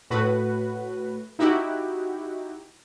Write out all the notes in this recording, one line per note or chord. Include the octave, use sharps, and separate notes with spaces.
A2 F#4 B4
D#4 E4 F#4 G4